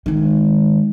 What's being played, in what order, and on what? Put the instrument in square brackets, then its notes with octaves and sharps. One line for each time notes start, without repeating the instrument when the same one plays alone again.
[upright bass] D#3 G#3